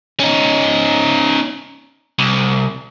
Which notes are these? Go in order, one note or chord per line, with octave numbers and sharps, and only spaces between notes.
C#4 D#4
C2